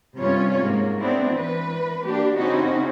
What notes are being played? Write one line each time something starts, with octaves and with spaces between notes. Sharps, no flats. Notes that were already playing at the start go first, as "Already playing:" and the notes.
G2 C3 G3 C#4 F4 C#5
G#2 A#3
B3 C4 D4 E4
E3 B4
A#3 D4 G4
C#3 C4 C#4 D#4 E4 F#4